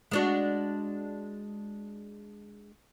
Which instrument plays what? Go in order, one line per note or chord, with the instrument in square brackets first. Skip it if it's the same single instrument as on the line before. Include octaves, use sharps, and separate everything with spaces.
[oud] G#3 D4 F#4